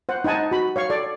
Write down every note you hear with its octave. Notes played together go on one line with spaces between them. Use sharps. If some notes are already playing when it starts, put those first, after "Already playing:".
C5 F#5
D#4 C5 F#5 G#5 A5
F#4 B5
C#5 F5 C#6
A4 D5